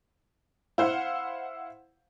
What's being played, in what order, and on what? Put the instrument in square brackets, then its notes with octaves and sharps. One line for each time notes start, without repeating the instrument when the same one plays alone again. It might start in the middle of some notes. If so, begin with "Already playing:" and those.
[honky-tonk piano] E4 C5 F5 F#5